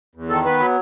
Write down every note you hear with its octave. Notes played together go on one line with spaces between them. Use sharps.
E2
D#3 A4
B3 B4
F#3